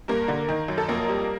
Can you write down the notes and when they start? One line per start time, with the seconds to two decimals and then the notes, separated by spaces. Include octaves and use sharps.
0.08 G2 A#3 A#4
0.28 D3
0.49 D#3
0.68 F#2
0.78 A4
0.88 F2 A#3 A#4
1.08 G3